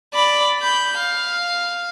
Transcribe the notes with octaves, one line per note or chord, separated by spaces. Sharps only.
D5 B5
B5 G6
F5